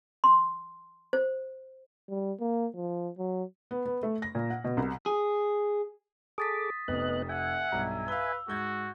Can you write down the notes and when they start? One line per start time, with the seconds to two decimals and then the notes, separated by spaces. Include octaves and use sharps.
0.24 C6
1.13 C5
2.09 G3
2.40 A#3
2.75 F3
3.18 F#3
3.71 B3
3.86 B3
4.03 A3
4.22 A#6
4.35 A#2
4.50 F#5
4.64 B2
4.77 C2
5.06 G#4
6.38 G#4 A4 D6 D#6 A6 B6
6.88 F1 C3 B3 D#5 F#6
7.29 E5 F#5 G#5
7.72 B1 G2 A#5
8.08 B4 F5 E6 G7
8.48 G#2 F#4 G6 G#6